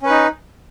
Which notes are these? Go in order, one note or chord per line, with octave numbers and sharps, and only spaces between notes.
C#4 D#4 B4